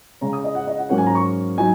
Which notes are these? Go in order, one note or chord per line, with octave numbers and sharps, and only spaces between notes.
C#3 G#3 C#4 A#5
D#6
D#5
F#5
D#5
F#5
G#2 F#3 A#3 C#4 F#5
G#5
A#5
C#6
F#3 D#4 G#5